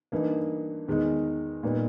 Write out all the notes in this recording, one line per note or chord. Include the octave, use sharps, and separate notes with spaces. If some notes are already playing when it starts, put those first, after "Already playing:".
G2 E3 A#3 D#4
E2 D#3 G#3 D#4
A#2 G3 B3 D#4